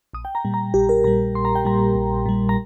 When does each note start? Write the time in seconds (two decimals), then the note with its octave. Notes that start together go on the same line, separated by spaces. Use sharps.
0.13 A#1 D#6
0.25 G5
0.35 A#5
0.45 A#2 G3
0.54 A#5
0.74 A#1 G4
0.89 A#4
1.04 A#2 G3 A#5
1.35 A#1 C6
1.45 A#5
1.55 G5
1.65 A#2 G3 A#5
1.95 A#1
2.26 A#2 G3
2.49 A#5